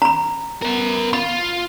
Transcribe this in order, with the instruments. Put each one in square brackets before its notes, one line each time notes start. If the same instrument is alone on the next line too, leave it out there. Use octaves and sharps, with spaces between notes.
[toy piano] A#5 B5
[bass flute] B3 [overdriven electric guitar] A#4 F#5
[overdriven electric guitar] F4 [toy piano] B5